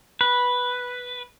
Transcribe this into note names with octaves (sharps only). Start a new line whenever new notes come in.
B4